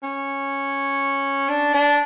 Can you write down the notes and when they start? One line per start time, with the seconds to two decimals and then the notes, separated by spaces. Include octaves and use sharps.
0.03 C#4
1.49 D4
1.74 D4